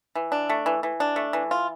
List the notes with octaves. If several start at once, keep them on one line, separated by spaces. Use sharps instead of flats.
E3
D4
A3
E3
E3
D4
A3
E3
F4